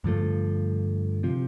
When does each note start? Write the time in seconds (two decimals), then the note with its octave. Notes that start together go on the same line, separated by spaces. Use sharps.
0.04 G2 D3 F3 A3
1.23 C3 F3